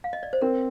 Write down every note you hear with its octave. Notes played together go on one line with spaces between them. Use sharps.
F5
D#5
D5
C5
C4 A#4